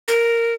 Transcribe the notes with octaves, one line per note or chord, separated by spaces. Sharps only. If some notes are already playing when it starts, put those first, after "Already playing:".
A#4